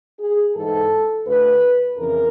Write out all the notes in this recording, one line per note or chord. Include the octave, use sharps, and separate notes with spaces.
G#4
G#2 E3 A4
D2 D3 B4
F2 C#3 E3 A#4